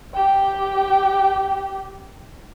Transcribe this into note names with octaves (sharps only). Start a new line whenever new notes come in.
G4 G5